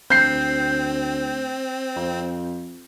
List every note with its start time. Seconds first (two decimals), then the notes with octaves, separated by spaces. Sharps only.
0.10 D2 C4 G6 C7
1.96 F2